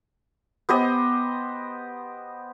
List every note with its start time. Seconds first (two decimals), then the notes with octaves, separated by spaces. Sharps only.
0.69 B3 G4 C5 D#5